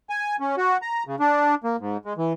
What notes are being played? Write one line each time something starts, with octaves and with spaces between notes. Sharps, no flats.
G#5
C#4
F#4
A#5
C#3
D4
A#3
G#2
G#3
E3